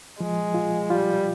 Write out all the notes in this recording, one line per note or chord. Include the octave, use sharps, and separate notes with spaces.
F3 G#3
F4
G3 F4